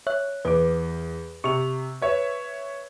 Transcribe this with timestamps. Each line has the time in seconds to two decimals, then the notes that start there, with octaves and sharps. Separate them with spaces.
0.07 C#5 E5 F#6
0.45 E2 B4 D6
1.44 C3 C#6 F7
2.02 B4 C#5 E5